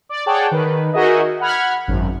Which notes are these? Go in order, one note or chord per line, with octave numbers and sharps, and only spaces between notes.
D5
G#4 C#5 D5 F#5 G5 A5
D#3 B4
D#4 F#4 G#4 A#4 D#5 E5
F#5 B5 F6 G#6
G#1 F#2